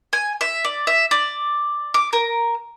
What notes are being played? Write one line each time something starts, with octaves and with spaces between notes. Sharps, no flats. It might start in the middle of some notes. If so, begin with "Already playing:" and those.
G#5
E5
D5
E5
D5
D6
A#4